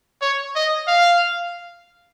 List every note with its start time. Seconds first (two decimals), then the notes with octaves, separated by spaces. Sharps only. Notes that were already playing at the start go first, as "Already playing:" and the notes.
0.22 C#5
0.56 D#5
0.88 F5